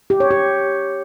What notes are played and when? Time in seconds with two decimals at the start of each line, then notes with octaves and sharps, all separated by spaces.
0.10 G4
0.20 C#5
0.31 G4